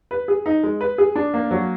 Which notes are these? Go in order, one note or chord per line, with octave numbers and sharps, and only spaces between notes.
B4
G#4
D#4
G#3
B4
G#4
D4
A#3
F#3